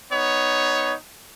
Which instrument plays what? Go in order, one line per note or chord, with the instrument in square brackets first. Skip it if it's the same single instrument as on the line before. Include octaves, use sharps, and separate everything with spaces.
[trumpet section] B3 D#4 C#5